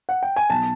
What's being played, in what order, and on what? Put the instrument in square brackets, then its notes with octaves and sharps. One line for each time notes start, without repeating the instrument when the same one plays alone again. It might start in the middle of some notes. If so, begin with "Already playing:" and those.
[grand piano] F#5
G5
G#5
B1 A5